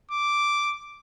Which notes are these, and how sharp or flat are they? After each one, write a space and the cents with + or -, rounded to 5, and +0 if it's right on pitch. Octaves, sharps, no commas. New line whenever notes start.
D6 -5